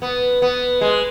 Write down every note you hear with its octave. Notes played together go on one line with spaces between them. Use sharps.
B3
B3
G#3